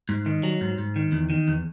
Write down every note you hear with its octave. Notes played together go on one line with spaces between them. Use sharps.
G#2
D#3
F#3
G#2
G#2
D#3
E2
D#3
E2